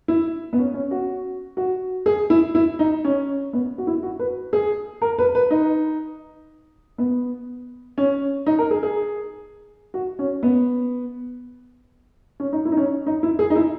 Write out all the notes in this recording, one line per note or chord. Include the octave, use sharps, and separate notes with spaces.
E4
B3
C#4
C#4
F#4
F#4
G#4
E4
E4
D#4
C#4
B3
F#4
E4
F#4
B4
G#4
A#4
B4
B4
D#4
B3
C#4
D#4
A#4
G#4
G#4
F#4
C#4
B3
C#4
D#4
E4
D#4
C#4
D#4
E4
G#4
D#4
E4